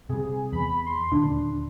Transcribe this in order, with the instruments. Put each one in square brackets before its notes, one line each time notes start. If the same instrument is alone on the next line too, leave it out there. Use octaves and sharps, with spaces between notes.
[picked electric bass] C3 G3 [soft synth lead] G#4
[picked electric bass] E2 [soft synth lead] B5
[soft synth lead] C6
[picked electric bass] D#1 D2 D3 [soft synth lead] D4